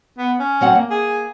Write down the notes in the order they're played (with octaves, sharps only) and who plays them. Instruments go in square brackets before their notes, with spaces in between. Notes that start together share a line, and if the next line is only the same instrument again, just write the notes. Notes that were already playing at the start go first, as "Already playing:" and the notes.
[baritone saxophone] B3
C#4
[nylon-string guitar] F#3 C4 F#5
A#3
[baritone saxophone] G#4